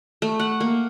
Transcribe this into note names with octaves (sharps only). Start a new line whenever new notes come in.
A3
F#5
A#3